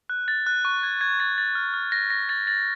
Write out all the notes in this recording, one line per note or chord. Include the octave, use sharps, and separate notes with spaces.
F#6
A6
F#6
C#6
G#6
G#6
A6
A6
F6
F6
A#6
A#6
A6
A6